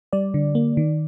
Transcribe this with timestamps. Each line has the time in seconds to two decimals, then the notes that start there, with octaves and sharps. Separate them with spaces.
0.13 G3 D5
0.34 D3
0.55 A#3
0.77 D#3